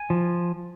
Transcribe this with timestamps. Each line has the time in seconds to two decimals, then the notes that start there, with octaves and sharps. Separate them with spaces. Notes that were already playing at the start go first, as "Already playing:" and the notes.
Already playing: G#5
0.10 F3